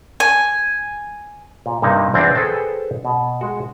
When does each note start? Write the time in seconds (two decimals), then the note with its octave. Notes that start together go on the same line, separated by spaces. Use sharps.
0.20 G#5
1.66 A#2
1.82 G2 C3 A#3 D#4
2.14 E2 C4 D4 F4
2.35 G#4 A4 B4 C5 G5 A5
3.05 B2
3.41 G#3 F#4